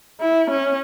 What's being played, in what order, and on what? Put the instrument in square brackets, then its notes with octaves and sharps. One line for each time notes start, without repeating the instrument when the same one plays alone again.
[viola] E4
C#4